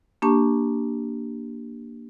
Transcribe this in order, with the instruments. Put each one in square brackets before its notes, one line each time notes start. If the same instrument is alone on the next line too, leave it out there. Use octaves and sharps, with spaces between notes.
[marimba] A#3 D4 G4 A5 C#6